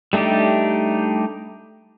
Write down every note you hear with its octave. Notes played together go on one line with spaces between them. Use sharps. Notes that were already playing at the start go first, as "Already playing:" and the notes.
G3 A3 D4 D#4 G4